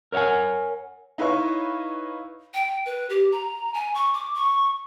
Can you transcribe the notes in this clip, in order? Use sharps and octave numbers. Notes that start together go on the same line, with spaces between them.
A#4 C#5 E5 F#5 G#5
D#4 E4 B4 C#5 F5 C#6
G5
B4
G4
A#5
G#5
C#6
D6
C#6